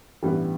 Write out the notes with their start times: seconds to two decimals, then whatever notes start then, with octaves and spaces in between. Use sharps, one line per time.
0.23 A1 G2 E3 G3 B3